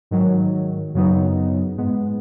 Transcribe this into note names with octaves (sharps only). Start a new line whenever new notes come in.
G#2 D#3 F#3
F#2 C#3 F#3 B3 D#4
G#2 G#3 B3